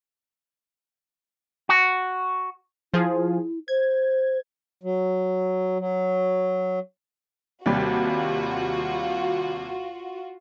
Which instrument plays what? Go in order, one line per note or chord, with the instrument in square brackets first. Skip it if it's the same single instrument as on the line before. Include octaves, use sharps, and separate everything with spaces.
[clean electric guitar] F#4
[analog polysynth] F3 F4 G#4 [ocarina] E4
[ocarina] C5 [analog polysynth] G#6
[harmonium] F#3
F#3
[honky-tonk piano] D#2 C3 G3 [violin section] F4 F#4